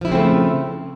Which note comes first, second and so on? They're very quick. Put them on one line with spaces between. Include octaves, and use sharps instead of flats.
F3 E4 C#3 C4 A3